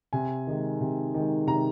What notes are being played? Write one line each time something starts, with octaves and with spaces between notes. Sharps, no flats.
C3 G#5
D#3 G#3
C3
D#3 G#3
C3 A#5